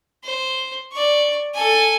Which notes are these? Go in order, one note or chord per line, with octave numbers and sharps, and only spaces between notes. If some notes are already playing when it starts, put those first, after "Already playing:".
C5
D5 C#6
A4 G#5